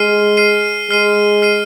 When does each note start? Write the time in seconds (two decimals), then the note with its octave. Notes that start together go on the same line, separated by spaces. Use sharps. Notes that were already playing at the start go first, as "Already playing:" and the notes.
Already playing: G#3 F6 C7 D#7
0.37 F6 C7 D#7
0.90 G#3 F6 C7 D#7
1.42 F6 C7 D#7